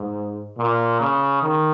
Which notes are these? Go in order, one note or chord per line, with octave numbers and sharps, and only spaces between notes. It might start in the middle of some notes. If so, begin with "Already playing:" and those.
Already playing: G#2
A#2
C#3
D#3